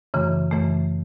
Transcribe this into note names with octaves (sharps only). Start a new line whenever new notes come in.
F#2 C#3 E3 A3
F#2 C#3 E3 A3